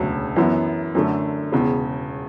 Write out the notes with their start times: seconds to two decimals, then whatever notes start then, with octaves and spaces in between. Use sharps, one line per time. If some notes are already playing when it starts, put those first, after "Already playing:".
Already playing: E1 D2 C#3 F#3
0.36 F#2 E3 B3
0.95 F#2 D3 A3
1.52 E1 E2 C#3